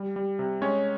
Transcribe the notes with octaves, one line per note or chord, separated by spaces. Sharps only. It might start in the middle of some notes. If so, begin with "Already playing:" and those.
Already playing: G3
G3
C3
G#3 C#4 C#5